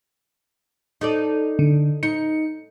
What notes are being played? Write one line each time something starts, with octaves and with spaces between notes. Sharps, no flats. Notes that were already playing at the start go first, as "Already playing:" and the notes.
D#4 A4 D5
D3
D#4 C#7